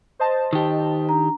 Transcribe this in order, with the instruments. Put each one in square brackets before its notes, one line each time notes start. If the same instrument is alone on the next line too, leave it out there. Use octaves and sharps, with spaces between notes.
[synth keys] C5 D#5 A5
[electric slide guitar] D#3 G4
[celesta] D4 A#5